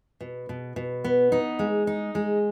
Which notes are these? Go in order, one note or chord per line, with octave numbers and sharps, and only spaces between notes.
B2
B2
B2
B3
D#4
G#3
D#4
G#3